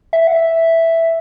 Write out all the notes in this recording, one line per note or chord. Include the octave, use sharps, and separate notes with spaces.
E5
F#5
E5